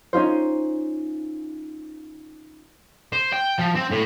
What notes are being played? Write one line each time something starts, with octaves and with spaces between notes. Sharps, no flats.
C#4 D#4 F4 C5
C5
G5
F3
C4
A2